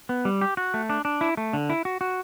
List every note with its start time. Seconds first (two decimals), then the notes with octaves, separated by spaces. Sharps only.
0.09 B3
0.25 G3
0.41 G4
0.57 F#4
0.74 A3
0.90 D4
1.05 D4
1.21 E4
1.37 A3
1.53 D3
1.70 E4
1.85 F#4
2.01 F#4